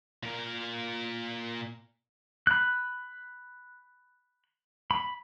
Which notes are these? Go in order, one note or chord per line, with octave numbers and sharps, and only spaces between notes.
A#2 A#4
B5 F#6
B5